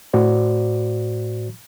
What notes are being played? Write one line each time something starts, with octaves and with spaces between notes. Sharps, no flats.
A2 F#4 C5 D5